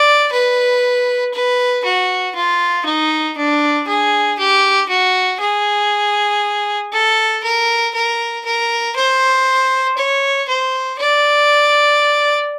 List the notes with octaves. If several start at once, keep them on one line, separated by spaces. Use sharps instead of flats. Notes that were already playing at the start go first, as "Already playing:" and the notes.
Already playing: D5
B4
B4
F#4
F4
D#4
D4
G#4
G4
F#4
G#4
A4
A#4
A#4
A#4
C5
C#5
C5
D5